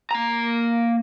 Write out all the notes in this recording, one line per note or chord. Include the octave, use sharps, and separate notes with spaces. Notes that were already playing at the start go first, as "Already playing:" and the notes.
A#3 A#5